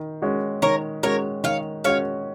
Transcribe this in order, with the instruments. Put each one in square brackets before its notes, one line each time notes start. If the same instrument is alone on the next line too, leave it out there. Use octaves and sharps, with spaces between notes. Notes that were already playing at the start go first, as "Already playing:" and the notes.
Already playing: [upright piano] D#3
G#3 C#4 F#4
[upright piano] D#3 [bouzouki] A#4 C#5
[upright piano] G#3 C#4 F#4 [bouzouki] A#4 C#5
[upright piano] D#3 [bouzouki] C#5 F5
[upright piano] G#3 C#4 F#4 [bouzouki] C#5 F5